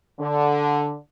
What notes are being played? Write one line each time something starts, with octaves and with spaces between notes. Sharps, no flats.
D3